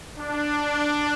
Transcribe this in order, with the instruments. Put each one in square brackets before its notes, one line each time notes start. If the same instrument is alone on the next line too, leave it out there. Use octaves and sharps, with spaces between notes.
[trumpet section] D4